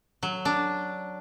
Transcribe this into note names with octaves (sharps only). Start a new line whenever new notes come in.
F#3
D4